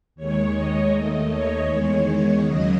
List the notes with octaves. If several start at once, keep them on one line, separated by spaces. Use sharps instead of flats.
D#2 D#3 G#3 C#5
D#5
D#2 D#3 A3
C#5
E2 D#3 G#3
D#2 C#3 F#3 D#5